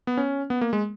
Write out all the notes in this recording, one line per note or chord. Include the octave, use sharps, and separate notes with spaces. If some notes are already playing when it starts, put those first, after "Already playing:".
B3
C#4
B3
A#3
G#3